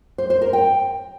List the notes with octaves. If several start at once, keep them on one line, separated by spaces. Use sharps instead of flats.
C5
C5
A#4
G5